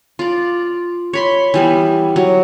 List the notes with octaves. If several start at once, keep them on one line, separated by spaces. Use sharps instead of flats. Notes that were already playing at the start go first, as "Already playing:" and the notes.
F4 D5
C#5 B5 C6
E3 G3 B3
F#3